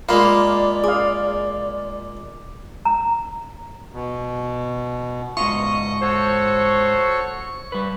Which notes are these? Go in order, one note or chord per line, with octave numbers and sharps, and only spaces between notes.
G#3 A#3 F4 D5 F5 A#5 B5 D6
G#4 F5 D6
A#5
B2
G#2 B2 F4 D#5 C#6 D#6
F#4 A4 C5 C#5
G3 B4